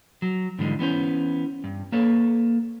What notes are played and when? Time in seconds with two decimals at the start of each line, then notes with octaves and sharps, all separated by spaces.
0.22 F#3
0.59 G#2 D3 E3 G3 G#3
0.79 E3 B3 C#4 C5
1.64 G2
1.92 A#3 A4 B4 C#5